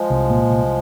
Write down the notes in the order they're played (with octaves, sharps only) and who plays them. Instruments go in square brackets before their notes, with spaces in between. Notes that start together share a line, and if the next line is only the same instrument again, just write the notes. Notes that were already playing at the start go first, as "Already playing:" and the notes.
Already playing: [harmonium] F3 G#3
[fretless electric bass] C2
A#2
C2